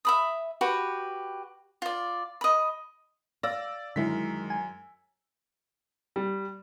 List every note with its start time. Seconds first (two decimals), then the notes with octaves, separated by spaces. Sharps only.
0.05 E5 B5 D#6
0.61 F#4 G4 B4
1.82 F4 D5
2.41 D#5 B5
3.43 D5 F5 E6 A#6
3.96 F#2 D3 D#3 G#3 E4 B6
4.50 G#5
6.16 G3